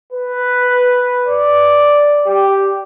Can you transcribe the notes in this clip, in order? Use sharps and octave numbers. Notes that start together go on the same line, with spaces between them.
B4
D5
G4